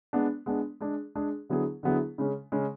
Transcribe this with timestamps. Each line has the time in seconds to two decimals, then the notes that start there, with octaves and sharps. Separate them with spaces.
0.13 G#3 B3 D4
0.46 G#3 B3 D4
0.80 G#3 D4 G#4
1.15 G#3 D4 G#4
1.49 D3 F#3 B3 E4 G#4
1.83 D3 F#3 B3 E4 G#4
2.18 C#3 G#3 C#4
2.52 C#3 G#3 C#4